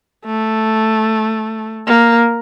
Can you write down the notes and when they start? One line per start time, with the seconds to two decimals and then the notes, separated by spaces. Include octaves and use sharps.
0.25 A3
1.87 A#3